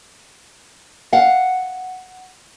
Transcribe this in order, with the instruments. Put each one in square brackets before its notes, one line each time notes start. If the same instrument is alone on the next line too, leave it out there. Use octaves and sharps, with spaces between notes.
[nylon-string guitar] F5 F#5